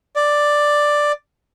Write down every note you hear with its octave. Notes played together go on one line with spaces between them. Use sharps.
D5